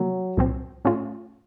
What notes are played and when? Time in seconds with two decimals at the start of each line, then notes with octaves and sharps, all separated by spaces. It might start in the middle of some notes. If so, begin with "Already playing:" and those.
Already playing: C3 F3 F#3 A#3
0.37 C2 A#2 F3 C4
0.85 A2 A3 C#4 F4